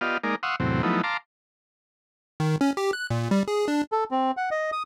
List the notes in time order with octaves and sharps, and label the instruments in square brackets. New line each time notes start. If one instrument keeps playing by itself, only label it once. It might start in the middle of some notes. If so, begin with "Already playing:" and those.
[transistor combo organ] B3 F4 G4 D5 D#5 F5
G#3 A#3 D#4 A#4 D5
F5 F#5 C6 C#6 D#6 E6
E2 A2 C3 F#3 C4
F3 F#3 A3 B3 D#4 E4
F5 A5 A#5 C6 D6
[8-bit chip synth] D#3
C#4
G4
F#6
A#2
G3
G#4
D4
[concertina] A4
C4
F#5
D#5
D#6